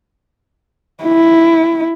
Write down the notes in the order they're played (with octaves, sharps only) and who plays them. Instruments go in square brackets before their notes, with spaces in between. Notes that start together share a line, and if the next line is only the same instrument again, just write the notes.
[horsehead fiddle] E4